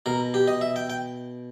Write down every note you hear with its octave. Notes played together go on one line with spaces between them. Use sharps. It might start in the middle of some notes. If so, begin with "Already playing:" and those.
B2 A#4
G4
D#5
E5
G5
G5